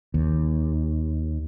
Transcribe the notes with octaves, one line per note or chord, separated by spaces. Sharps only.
D#2